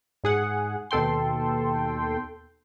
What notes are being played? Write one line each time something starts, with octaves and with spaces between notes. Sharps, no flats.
G#2 G#4 F#5
D#2 B2 A4 G5 C6